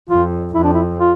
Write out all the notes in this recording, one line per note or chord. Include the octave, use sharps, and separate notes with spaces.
F2 F4
F2 E4
D4
E4
F4